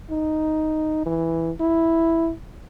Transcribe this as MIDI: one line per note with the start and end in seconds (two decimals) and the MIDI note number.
0.10 1.01 63
1.06 1.51 52
1.60 2.31 64